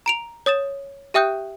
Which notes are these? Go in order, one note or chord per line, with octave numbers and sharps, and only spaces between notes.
A#5 D7 F7
C#5 D#6 A6 E7
G4 E5 G5 D#6 F#6 G6